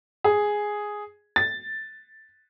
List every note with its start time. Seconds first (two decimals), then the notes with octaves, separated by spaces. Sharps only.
0.24 G#4
1.36 A6